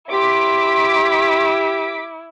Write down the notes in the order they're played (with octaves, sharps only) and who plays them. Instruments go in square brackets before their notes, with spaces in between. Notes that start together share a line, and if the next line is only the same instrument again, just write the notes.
[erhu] E4 [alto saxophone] G4 [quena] C6 [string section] D6 B6